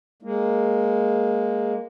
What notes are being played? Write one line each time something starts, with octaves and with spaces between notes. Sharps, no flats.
G#3 A#3